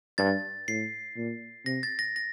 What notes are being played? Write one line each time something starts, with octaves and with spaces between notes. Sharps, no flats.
G2 A6
A2 C7
A#2
C3 A#6
A6
A#6
A#6